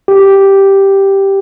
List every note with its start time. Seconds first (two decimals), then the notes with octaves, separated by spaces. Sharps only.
0.08 G4